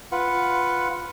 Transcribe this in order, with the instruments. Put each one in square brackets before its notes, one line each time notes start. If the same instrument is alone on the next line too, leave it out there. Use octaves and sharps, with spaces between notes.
[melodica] F4 B4 F#5